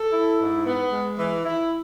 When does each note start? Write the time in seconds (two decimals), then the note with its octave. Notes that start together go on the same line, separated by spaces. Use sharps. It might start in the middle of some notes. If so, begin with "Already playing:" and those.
Already playing: A4
0.13 E4
0.40 G#2
0.66 B3
0.92 G#3
1.19 E3
1.45 E4